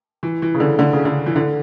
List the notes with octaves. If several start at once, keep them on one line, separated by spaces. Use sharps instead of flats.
E3
E3
C#3
D3
D3
C#3
D3
E3
D3